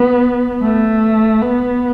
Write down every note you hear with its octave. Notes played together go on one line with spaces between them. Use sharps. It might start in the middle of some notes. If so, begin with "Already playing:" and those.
Already playing: B3
A3
B3